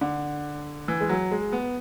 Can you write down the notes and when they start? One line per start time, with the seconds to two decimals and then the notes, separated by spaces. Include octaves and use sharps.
0.01 D3
0.88 E3
1.01 G#3
1.09 F#3
1.31 G#3
1.52 B3